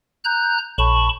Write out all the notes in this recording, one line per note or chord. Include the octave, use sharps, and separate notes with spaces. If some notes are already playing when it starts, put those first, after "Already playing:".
A#5 F#6 G6
A#1 A5 B5 C#6